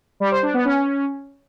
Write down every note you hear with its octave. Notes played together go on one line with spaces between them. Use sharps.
G3
C5
D4
B3
C#4